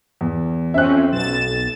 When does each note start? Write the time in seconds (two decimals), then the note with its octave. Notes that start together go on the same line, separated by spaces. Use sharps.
0.21 E2
0.74 F2 C4 C#4 E5 F#6
1.12 B1 A6 E7